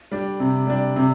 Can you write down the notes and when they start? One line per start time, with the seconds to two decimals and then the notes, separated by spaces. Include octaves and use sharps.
0.11 G3 D4
0.40 C3
0.67 G3 D4
0.96 C3